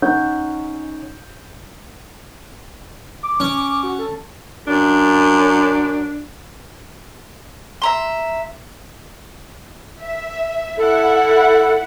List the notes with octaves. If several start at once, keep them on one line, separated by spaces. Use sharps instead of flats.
C#4 D#4 F#5 G6
D6
C#4
F#4
A4
F#2 D4
E5 A#5 C6
E5
E4 A4 F#5